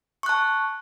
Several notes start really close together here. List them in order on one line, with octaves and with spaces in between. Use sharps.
C#6 F#6 A5